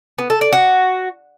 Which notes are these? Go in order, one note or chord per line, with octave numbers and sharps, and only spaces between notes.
B3
A4
D5
F#4